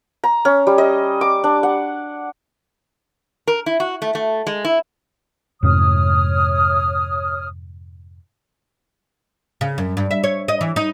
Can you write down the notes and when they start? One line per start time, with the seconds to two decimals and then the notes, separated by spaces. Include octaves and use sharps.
0.24 A#5
0.45 C#4
0.67 G3
0.78 D#5
1.21 D6
1.44 D4
1.63 F#5
3.47 A#4
3.66 E4
3.80 F#4
4.02 A3
4.15 A3
4.47 G#3
4.65 E4
5.63 F2 G#2 C3 C#5 D#6 F6
9.61 C#3
9.78 F#2
9.97 G2
10.11 E5
10.23 C#5
10.48 D#5
10.61 E3
10.76 D#4